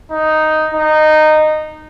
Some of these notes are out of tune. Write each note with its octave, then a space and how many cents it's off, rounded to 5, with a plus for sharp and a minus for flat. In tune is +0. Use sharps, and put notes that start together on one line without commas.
D#4 +0
D#4 -15